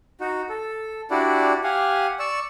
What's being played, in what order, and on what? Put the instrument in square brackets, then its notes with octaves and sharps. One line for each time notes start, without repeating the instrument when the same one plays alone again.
[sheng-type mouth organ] D#4 F#4
A4
D4 E4 F#4 G4 D5
G4 F5 F#5 G#5
D5 C#6 E6